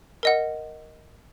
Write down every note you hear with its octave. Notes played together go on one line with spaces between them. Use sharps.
A#4 D#5 F#5